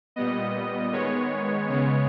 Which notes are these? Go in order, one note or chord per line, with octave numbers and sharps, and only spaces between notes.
A#2 G3 B3 D#5
D#3 G#3 B3 C#5
C#3 G#3 B3 C#5